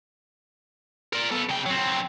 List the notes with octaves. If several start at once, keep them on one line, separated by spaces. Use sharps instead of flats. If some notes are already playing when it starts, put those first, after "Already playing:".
A#4 D5
B3 A4
C#3 G5
F#3 C4